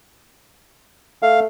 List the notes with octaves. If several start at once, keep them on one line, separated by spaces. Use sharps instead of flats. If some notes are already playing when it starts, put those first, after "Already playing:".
A3 F5